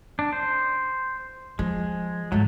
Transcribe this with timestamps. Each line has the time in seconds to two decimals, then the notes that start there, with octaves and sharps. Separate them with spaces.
0.19 D4
0.33 C5
1.59 F3 G#3
2.32 G#2 F#3 G#3 A3